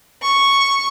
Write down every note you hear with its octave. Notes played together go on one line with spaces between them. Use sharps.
C#6